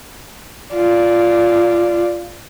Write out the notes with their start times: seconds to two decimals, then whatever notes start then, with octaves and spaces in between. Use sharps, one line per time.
0.74 F4 D5